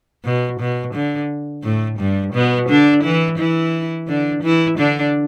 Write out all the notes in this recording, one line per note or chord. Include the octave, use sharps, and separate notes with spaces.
B2
B2
D3
A2 A3
G2 G3
B2 B3
D3 D4
E3 E4
E3 E4
D3 D4
E3 E4
D3 D4